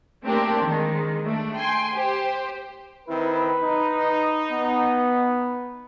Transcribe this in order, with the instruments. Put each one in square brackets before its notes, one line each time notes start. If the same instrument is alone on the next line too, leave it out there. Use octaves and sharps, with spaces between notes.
[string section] A3 A#3 C4 D4 G4 A#4
D#3 G#3
A3 D4
G5 G#5 C6
G4 C5
[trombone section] D#3 C4 E4 [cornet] B4
[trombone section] D#4
[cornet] B3